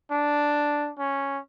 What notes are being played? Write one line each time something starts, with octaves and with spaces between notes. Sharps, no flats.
D4
C#4